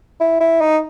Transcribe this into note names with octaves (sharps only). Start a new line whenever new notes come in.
E4
E4
D#4